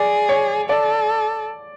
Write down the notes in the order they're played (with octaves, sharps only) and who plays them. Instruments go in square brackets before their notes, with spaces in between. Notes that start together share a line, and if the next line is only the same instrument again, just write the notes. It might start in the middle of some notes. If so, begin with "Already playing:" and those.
Already playing: [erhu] G#4 [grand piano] D5
[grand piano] C#5
[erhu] A4 [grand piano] D5